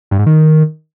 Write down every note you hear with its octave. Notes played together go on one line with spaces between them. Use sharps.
G2
G#2
D#3